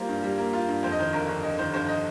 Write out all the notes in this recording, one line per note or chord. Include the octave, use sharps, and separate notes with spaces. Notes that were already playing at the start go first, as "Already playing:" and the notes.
Already playing: G3 A#3 F4 C5
G2
G3
A#3
F4
G2
F2 C5
D#5
D#3 C5
G1 A#4
G1
F2 D#5
D#3 C5
G1 C5
D#5